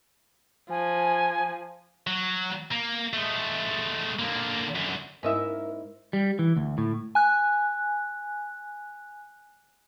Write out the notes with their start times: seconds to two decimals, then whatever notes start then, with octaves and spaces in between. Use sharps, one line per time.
0.70 F3 G#5
2.07 F#3
2.72 A#3
3.13 G#3 A3
4.19 D3 A#3
4.75 F#2 D3
5.23 G#2 A#3 C#4 E4 A#4 D#5 E5
6.13 G3
6.39 E3
6.57 D2
6.78 A2
7.15 G#5 F#6